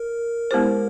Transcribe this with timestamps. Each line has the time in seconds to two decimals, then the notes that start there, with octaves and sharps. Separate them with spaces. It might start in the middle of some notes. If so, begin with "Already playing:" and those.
Already playing: A#4
0.51 G#3 B3 E4 G4 C5